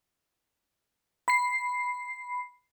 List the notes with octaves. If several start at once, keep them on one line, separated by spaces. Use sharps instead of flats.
B5 C7